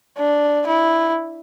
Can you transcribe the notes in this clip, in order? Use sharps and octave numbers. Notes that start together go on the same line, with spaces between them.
D4
E4